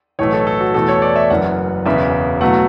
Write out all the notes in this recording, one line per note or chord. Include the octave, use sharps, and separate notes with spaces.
B1 A2 E3 A3 C#5
A4
A4
F#4
E2 B2 A3 A4
C#5
D5
E5
F#1 F#2 E3 F#5
E1 E2 C#3 E3 E5
B2 F#3 A3 F#5